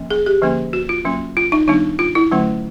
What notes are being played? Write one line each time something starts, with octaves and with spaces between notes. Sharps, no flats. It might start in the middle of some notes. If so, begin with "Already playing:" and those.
Already playing: F3 A#3 C#4
G#4
G4
D3 F3 A#3 C#4
F#4
F4
F#3 A#3 C#4
F4
D#4
D#3 G3 B3 D4 D#4
F4
E4
D3 F#3 A3 C#4